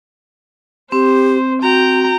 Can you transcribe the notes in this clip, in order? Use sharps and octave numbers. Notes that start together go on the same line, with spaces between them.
C4 G4 C5
F#4 G5 A#5